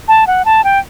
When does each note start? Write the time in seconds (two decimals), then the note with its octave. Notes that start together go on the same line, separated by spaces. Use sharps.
0.08 A5
0.27 F#5
0.45 A5
0.64 G5